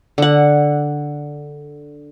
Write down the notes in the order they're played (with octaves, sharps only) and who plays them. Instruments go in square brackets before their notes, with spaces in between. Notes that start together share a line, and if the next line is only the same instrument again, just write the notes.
[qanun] D3 F#5